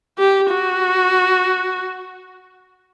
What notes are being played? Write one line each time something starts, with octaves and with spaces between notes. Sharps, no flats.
G4
F#4